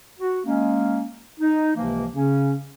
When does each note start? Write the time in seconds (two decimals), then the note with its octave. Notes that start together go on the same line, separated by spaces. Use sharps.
0.20 F#4
0.45 G#3 A#3 C#4
1.40 D#4
1.76 C#2 C3 E3 F3 A#3
2.15 C#3 C#4